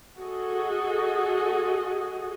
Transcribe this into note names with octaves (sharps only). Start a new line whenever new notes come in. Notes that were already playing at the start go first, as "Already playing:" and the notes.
F#4 G#4 A4 D#5